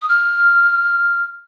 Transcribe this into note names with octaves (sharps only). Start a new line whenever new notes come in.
D#6
F6